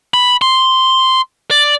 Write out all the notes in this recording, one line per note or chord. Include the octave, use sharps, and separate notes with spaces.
B5
C6
D5